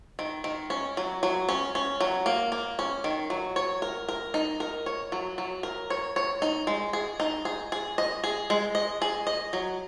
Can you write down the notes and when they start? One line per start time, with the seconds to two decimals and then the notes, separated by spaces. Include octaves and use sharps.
0.19 D#3
0.44 D#3
0.70 C#4
0.97 F#3
1.23 F#3
1.49 C#4
1.75 C#4
2.01 F#3
2.26 A#3
2.52 A#3
2.79 C#4
3.04 D#3
3.30 F#3
3.56 C#5
3.82 A#4
4.09 A#4
4.34 D#4
4.60 A#4
4.86 C#5
5.12 F#3
5.38 F#3
5.63 A#4
5.90 C#5
6.16 C#5
6.42 D#4
6.67 G#3
6.93 G#4
7.20 D#4
7.45 G#4
7.72 G#4
7.98 D#5
8.24 G#4
8.50 G#3
8.75 D#5
9.02 G#4
9.27 D#5
9.53 F#3